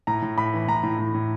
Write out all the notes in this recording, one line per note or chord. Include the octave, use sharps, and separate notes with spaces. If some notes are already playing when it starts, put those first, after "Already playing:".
A2 A#5
A2
A2 B5
E3
A2 A#5
A2
A2
A2